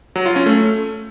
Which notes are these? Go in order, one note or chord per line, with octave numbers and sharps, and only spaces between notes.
F#3
F4
C#4
A3